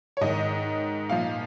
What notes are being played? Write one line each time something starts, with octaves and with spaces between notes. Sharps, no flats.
C#5
G#2 D#3 D#5
A#2 F3 F5